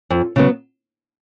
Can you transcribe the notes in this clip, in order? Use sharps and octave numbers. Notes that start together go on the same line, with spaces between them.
F2
C#3 F#3 B3